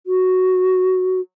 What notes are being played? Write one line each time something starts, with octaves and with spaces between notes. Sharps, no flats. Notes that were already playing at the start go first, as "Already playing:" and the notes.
F#4